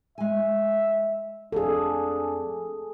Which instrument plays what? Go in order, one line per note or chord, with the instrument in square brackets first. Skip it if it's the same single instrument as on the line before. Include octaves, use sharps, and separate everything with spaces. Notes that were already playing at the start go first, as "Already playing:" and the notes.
[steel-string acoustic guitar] G#3 G#5 [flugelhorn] E5
[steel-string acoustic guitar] F2 [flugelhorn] D4 [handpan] G#4 A4